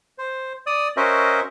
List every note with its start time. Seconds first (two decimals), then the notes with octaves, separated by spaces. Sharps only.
0.18 C5
0.66 D5 D#6
0.97 C#4 F#4 A#4 C5 D#5 E5